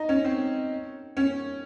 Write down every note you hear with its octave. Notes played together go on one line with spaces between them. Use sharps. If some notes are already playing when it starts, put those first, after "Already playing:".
Already playing: D#4
C#4
C4
C#4